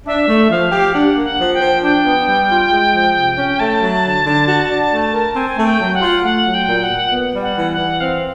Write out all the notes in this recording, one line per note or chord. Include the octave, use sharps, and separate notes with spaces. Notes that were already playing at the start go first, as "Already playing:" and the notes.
D4 E5
A3
F3 F5
G4
D4 F#5
A#3
F#5
F3
G5
F3
D4 G5
B3
G3
F4
G#3
F3
C3
C#4
A3 A5
F#3
D3
D3
F#4
D4
A3
A#4
C4 G#5
A3
G5
F#3
F#5
F4
A3 F#5
F#3
G5
A#2
F#5
A#2
B3
G3
F#5
E3
F#5
E3
C4 F5